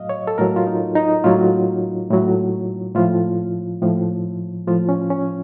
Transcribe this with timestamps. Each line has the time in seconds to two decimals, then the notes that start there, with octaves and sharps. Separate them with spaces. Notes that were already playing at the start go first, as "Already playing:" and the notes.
Already playing: A2 F#3 D#5 F5
0.09 C#5
0.27 A4
0.38 A2 F#3 A#4
0.56 F4
0.67 D#4
0.95 D#4
1.24 A2 F#3 F4
2.10 A2 F#3
2.95 A2 F3 F4
3.82 A2 F3
4.67 A2 F3 F4
4.89 C#4
5.10 C#4